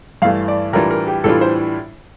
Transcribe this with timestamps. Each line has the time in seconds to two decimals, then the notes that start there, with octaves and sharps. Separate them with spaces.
0.22 G2 E3 A3 F5
0.48 D5
0.73 A2 E3 G3 D4 F4 A#4
0.91 A#4
1.07 G4
1.24 A2 E3 G3 D4 F4 A4
1.41 C5